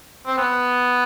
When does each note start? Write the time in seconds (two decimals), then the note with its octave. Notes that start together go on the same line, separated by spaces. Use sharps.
0.27 C4
0.37 B3